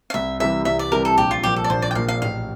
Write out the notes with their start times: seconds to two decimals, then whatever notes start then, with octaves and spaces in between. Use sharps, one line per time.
0.10 F5
0.14 C2 E5
0.40 C3 E3 G3 E5
0.65 C2 E5
0.79 D5
0.92 C3 E3 G3 A#4
1.05 A4
1.17 A#1 G4
1.31 F4
1.43 A#2 F3 G4
1.56 A4
1.64 D5
1.70 A#1 C5
1.82 D5
1.91 G5
1.95 A#2 F3 F5
2.08 F5
2.22 A1 F5